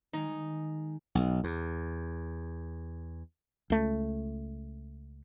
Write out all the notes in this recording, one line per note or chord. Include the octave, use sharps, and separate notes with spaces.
D#3 G#3 D#4
B1
E2
C#2 A3